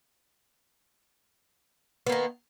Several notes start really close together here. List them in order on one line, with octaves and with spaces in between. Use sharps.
B3 A#3 D#3